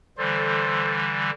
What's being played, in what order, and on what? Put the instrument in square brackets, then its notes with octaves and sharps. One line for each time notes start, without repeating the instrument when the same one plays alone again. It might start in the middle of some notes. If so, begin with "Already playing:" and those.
[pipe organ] D3 E3 G3 [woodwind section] A4 C5